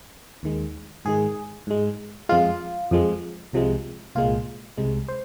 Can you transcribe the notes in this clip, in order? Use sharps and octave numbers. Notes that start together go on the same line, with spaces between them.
D#2 D#3 G#3
G#2 D#3 G#3 G#4
G#2 G#3
F2 F3 G#3 F4
F2 F3 G#3
C2 C3 F3 G#3
C2 A#2 G#3 F4
C2 C3 G#3
C5